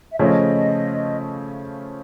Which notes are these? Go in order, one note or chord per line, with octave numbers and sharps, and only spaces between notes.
E5
C#3 F3 A3 C#4 D#5